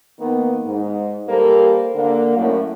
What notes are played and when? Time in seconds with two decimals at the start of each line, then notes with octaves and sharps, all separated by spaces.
0.19 D#3 A#3 B3
0.65 G#2
1.28 G3 A#3 G4 A4 A#4 C5
1.95 D3 A#3
2.36 F#2 A2